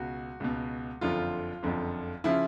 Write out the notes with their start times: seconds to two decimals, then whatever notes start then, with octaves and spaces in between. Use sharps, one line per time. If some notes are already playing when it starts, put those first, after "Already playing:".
Already playing: C#2 B2 F#4
0.40 C#2 B2
1.01 F#1 F2 D3 F3 F4
1.63 F#1 F2 D3 F3
2.24 C#3 F3 E4